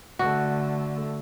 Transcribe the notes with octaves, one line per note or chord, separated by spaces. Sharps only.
D3 A3 F#4